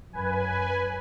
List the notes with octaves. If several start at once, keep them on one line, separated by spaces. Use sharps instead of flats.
F#2 B4 G#5